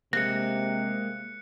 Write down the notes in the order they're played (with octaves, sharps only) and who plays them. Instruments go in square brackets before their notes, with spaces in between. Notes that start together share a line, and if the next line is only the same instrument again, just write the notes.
[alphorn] C3 [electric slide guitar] G#3 A#3 [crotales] F#6 C#7 [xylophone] A#6